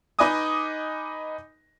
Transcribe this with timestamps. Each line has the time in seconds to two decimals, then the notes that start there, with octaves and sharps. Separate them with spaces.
0.19 D#4 B4 D#5 G#5 D6 D#6